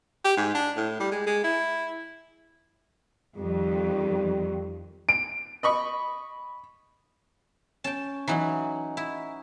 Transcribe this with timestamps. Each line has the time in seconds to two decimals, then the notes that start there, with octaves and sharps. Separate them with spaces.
0.25 G4
0.37 G#2
0.55 D4
0.77 A2
1.00 G3
1.12 G#3
1.27 G#3
1.44 E4
3.37 F2 D#3 G3
5.09 D7
5.63 D#5 B5 C#6
7.84 C#4 G5 A5
8.28 E3 F#3 D#4 F#5
8.97 E4